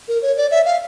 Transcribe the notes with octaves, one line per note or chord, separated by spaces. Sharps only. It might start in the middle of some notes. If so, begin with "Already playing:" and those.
A#4
C#5
D5
E5
F5